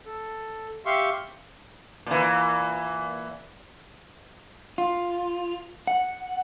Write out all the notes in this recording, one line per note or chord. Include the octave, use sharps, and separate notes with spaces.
A4
G4 E5 F5 C6 C#6
A#2 E3
F4
F#5